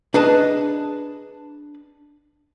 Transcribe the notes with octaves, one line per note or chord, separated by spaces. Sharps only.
D4 G#4 B4 D#5 A5